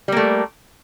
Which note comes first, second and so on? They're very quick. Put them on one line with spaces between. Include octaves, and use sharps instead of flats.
G3 A#3 A3